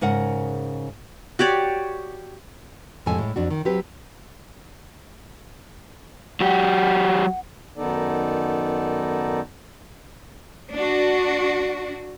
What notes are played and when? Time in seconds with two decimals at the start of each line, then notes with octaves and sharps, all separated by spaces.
0.01 G#2 C#3 A#4 F#5
1.39 F#4 G4 C#5 D5
3.06 F2 A2 C3 G#3 A4 G#5
3.19 A2 G#3
3.36 F2 D4 F#4
3.51 D#3
3.65 F#3 C4 G4 B4
6.41 F#3 G4 F#5
7.77 F#2 D#3 B3 D#4 A4 D5
10.72 D4 F#4